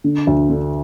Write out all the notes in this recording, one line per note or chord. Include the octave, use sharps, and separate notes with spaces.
D3
D2
D3